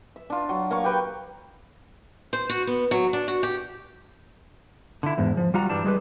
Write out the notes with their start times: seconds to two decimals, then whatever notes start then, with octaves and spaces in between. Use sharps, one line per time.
0.16 E5
0.30 D4 F4
0.49 F#3
0.71 A#3 F5 C#6
0.84 G4 B4 G5
2.33 C5
2.49 F#4
2.67 B3
2.91 F#3
3.13 D4
3.28 F#4
3.43 G4
5.03 D3 E4
5.18 E2 G#2
5.37 F3
5.54 G3 F4 F#4 A#5
5.69 G2 E3 G3 D4 A5
5.84 G3 G#3 G4 B4